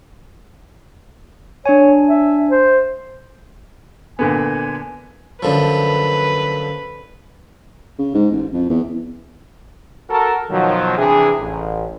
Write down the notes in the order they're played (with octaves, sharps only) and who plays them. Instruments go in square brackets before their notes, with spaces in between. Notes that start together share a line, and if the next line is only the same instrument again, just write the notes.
[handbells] D4 G#5 [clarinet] C#5
[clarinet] E5
C5
[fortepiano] A#2 D3 B3 [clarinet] G#5
[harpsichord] F#2 D3 F3 [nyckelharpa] B4
[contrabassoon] C#3
G#2
A1
F2
E2
[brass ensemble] F#4 A4 A#4
B2 D#3 F3 F#3
C3 E3 D4 G#4
A1